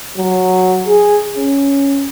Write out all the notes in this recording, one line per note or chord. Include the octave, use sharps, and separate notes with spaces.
F#3
G#4
C#4